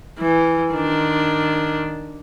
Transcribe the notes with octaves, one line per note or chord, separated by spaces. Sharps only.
E3
D#3 D4